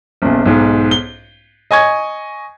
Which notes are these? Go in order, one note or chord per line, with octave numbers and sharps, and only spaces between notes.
F#1 B1
B1 G#2
G7
D#5 G#5 C#6 G#6